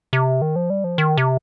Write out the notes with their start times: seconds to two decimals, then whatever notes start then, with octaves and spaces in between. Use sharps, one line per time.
0.13 C3
0.42 D#3
0.56 F3
0.70 G3
0.84 F3
0.98 D#3
1.17 C3